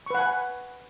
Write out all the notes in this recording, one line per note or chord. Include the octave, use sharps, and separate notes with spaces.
B4 F#5 G#5 C#6